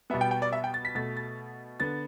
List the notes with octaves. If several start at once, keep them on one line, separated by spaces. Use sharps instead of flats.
B2 G3 B3 E5
G5
G5
D5
E5
G5
A6
B6
B2 A3 A6
A6
D3 B3 A6